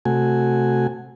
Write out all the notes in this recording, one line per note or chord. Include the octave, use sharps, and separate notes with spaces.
C3 A3 F#4 G#5